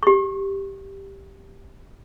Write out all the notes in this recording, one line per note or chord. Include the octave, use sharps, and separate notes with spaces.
G4 C#6